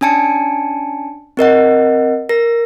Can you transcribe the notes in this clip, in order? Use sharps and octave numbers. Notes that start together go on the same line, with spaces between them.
C#4 D4 G#5 A5 C#7
C4 A#4 D#5 F#5
A#4 A#6